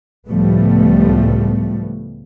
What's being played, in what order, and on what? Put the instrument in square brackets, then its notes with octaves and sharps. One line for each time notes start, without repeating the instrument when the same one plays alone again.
[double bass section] C#2 A2 F3 G3 A3 B3